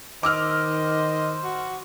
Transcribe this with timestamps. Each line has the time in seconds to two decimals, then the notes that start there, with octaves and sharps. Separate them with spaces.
0.23 D#3 C5 D#5 D6 E6 F6
1.44 F#4